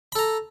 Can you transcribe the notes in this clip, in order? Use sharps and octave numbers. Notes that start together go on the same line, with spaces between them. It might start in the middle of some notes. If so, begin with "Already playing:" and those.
A4 A#5 B5